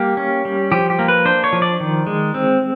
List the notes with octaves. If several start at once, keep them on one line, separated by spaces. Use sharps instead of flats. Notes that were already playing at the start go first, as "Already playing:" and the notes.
Already playing: G3 A#3 G4
C#4
G3
F3 G4
G4
A#3
B4
D4 C5
C#5
F3
D5
D#3
G#3
C4